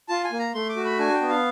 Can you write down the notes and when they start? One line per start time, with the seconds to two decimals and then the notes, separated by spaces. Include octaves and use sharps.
0.09 F4 A5
0.24 G#5
0.32 A#3
0.39 A#5
0.54 A3 C6
0.69 D6
0.76 F#4
0.85 B5
0.99 D4 G#5
1.14 G5
1.22 B3
1.29 F5